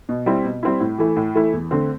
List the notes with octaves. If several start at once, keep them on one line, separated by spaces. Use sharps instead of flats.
B2
G3 C4 E4
B2
G3 C4 E4
A2
E3 A3 E4
A2
E3 A3 E4
E2
D3 A3 C4